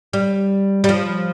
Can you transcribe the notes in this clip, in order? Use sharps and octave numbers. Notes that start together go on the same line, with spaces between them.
G3
G3
F3